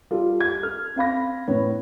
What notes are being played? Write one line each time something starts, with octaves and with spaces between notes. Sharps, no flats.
G3 F4 A4
G#6
A4 F6
C4 F5 B5 A#6
A2 B3 C#5